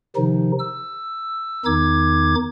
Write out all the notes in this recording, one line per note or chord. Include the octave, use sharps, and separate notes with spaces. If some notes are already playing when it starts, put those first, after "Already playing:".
C3 D#3 F3 D#4
E6
E2 D#3 D#4 D6 G#6